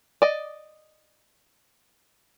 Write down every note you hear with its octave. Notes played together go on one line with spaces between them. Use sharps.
D5 D#5